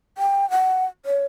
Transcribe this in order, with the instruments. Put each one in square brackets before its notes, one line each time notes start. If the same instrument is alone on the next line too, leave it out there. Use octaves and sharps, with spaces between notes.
[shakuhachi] G5
F#5
C#5